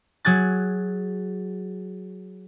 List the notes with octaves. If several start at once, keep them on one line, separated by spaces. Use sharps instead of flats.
F#3 G#4 F#6 A6